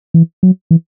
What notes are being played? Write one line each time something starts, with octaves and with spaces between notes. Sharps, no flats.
E3
F#3
E3